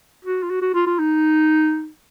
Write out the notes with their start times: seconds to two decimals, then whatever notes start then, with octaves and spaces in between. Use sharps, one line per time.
0.25 F#4
0.43 F4
0.50 F#4
0.62 F#4
0.74 F4
0.87 F4
0.99 D#4